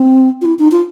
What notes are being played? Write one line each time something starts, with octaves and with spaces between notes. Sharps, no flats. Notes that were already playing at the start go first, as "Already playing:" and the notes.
Already playing: C4
F4
E4
D#4
F4